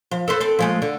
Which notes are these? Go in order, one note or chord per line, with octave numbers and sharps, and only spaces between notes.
F3
A4 B4 C5
C4 A4
F3 G#3 A3
D3